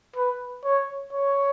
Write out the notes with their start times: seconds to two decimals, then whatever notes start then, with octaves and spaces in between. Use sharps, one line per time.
0.16 B4
0.64 C#5
1.13 C#5